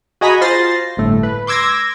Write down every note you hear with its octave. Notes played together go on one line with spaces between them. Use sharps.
F#4 G#4 D#5 G#5 A#5 B5
F4 C5 A6 A#6 C7
G1 A2 A3
B4
C6 D6 E6 G#6 A#6